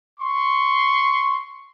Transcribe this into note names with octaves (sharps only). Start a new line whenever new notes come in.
C6 C#6